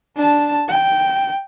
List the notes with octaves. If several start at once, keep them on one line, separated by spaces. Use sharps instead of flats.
D4 A5
G5